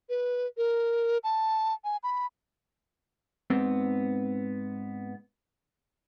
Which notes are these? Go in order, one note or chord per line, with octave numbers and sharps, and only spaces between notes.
B4
A#4
A5
G#5
B5
G#2 B3 C4